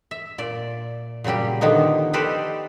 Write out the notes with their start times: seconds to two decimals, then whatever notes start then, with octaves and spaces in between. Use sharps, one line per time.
0.11 E5
0.38 A#2 D5
1.24 A#2 C#3 F#3 G3 G4
1.61 D3 D#3 F3 B3 D#4
2.13 D#4 G4 A4 B4 C5 D5